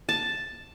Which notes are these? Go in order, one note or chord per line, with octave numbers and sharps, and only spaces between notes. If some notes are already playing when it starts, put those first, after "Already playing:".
A5